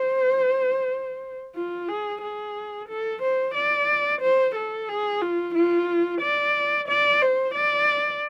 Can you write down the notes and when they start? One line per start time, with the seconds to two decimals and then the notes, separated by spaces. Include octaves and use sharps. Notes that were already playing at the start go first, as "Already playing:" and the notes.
Already playing: C5
1.56 F4
1.89 G#4
2.22 G#4
2.89 A4
3.23 C5
3.55 D5
4.21 C5
4.56 A4
4.89 G#4
5.22 F4
5.55 F4
6.21 D5
6.88 D5
7.22 C5
7.55 D5